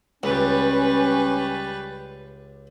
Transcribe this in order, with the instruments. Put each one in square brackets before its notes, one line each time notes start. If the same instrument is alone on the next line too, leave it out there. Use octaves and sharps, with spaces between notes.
[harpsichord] C#2 [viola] G3 B4 [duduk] C#4